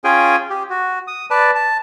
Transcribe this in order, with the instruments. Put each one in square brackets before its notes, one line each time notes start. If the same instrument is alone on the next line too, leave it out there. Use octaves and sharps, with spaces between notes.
[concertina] C#4 F4 G#4 G5 G#5
G4
F#4
D#6
B4 D5 A5
A5